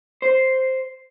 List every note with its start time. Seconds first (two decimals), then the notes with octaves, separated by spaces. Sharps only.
0.22 C5